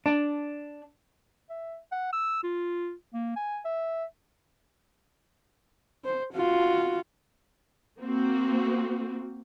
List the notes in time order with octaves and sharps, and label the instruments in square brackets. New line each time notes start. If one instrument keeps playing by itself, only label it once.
[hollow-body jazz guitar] D4
[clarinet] E5
F#5
E6
F4
A#3
G#5
E5
[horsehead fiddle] C5
F4 F#4
[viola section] A#3 C4 F#4